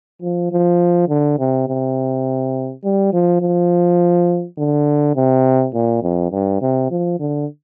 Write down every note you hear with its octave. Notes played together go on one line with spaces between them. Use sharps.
F3
F3
D3
C3
C3
G3
F3
F3
D3
C3
A#2
F2
G2
C3
F3
D3